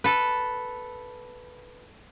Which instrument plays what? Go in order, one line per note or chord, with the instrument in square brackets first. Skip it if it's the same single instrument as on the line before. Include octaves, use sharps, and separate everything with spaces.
[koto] A4 B4